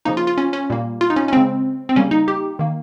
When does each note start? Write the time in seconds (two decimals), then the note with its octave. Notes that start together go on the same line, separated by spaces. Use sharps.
0.05 C#3 F3 A#3 D#4
0.17 F4
0.27 F4
0.37 C#4
0.53 C#4
0.70 A#2 G3 A#3
1.01 F4
1.10 D#4
1.16 C#4
1.28 C#4
1.32 C#3 G#3 C4
1.89 C4
1.96 C#3 G3 A#3 C#4
2.11 D#4
2.28 G4
2.59 D#3 A#3